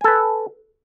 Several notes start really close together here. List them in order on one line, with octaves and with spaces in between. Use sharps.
G#5 A4 B4